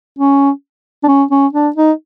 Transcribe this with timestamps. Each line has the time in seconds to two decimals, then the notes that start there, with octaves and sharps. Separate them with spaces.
0.19 C#4
1.03 D4
1.08 C#4
1.31 C#4
1.53 D4
1.76 D#4